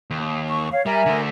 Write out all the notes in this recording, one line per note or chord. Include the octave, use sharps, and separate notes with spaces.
D#2
C#6
C#5 F5
G3 A#4 E5 G#5
D3 A3